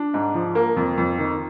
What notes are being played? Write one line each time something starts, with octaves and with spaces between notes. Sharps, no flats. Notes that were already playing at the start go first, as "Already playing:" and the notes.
Already playing: D4
G#2
F3
A#3
F2
F2
D#3